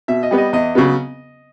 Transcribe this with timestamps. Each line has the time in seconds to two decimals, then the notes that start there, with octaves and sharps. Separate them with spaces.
0.08 B2 E5
0.23 D#5
0.31 G3 B3
0.38 D#5
0.53 E2 D#5
0.75 C#3 F#3 B3